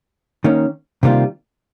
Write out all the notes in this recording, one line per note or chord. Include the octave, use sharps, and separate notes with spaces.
D#3 A#3 C#4
C3 D#3 G3 A#3 F4